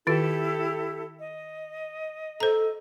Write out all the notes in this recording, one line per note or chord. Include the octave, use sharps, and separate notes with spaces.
D#3 E4 F4 G4 A4
D#5
A4 C5 A#5